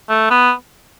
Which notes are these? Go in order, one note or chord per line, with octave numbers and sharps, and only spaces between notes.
A3
B3